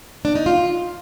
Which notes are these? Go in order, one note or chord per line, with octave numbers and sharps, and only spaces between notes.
D4
D#4
F4